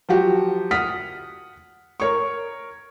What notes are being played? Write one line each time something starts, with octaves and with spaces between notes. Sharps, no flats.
F3 F#3 F#4 G4
F#5 D#6 F6 B6
A#4 C#5 C#6